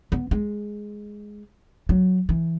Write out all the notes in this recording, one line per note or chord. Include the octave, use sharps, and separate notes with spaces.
B3
G#3
F#3
E3